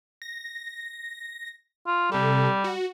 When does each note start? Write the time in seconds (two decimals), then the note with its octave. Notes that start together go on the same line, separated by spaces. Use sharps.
0.22 A#6
1.87 F4
2.12 C3 G3 A4
2.64 F#4